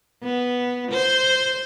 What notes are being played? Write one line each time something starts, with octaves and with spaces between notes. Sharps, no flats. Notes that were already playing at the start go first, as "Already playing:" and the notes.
B3
C5